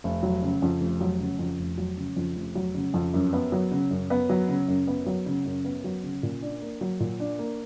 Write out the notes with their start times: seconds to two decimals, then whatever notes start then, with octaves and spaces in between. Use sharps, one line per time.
0.04 F1
0.23 F#3
0.42 C#3
0.62 F2
0.81 F1
1.01 F#3
1.20 C#3
1.39 F2
1.59 F1
1.78 F#3
1.97 C#3
2.16 F2
2.36 F1
2.55 F#3
2.75 C#3
2.94 F2
3.14 F#2
3.33 B3
3.52 F#3
3.71 C#3
3.91 F#2
4.10 B3
4.30 F#3
4.49 C#3
4.68 F#2
4.87 B3
5.06 F#3
5.26 C#3
5.45 F#2
5.65 B3
5.84 F#3
6.04 C#3
6.23 A#2
6.42 D4
6.62 A#3
6.81 F#3
7.00 A#2
7.20 D4
7.39 A#3